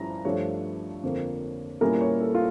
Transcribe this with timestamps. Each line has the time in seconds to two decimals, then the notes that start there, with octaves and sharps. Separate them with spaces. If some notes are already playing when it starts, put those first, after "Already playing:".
Already playing: G2 F3 C#4 E4 A#5
0.25 G2 F3 A3 D4 C#5
1.03 F2 D3 F3 A#3
1.81 A#2 G3 C#4 E4 A#4
2.01 C#5
2.21 A4
2.35 F4